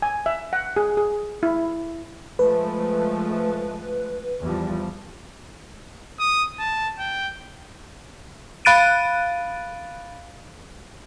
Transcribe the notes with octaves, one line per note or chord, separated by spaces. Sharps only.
G#5
E5
F#5
G#4
G#4
E4
F3 G#3 A3 B4
E2 F3 G3
D#6
A5
G5
F5 B5 F#6 A6 D7 D#7